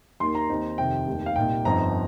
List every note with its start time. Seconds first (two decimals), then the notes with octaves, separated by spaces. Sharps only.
0.20 D#2 D#3 A#3 C6
0.35 A#5
0.49 D#2 D#3 C4 D#4
0.78 F2 C3 D#3 G5
1.07 F1 D#2 D#3
1.26 F5
1.36 C2 A#2 A#3 D#4 G5
1.65 G1 F2 F3 D#4 A#5